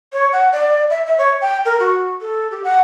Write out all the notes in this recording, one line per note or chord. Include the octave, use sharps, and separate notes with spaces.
C#5
F#5
D5
E5
E5
C#5
G5
A#4
F#4
A4
G4
F#5